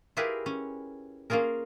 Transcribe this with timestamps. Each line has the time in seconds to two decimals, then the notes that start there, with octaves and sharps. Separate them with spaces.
0.17 E4 F4 G4 G#4 A#4 B4
0.46 C#4
1.30 A#3 C#4 F4 G#4 A#4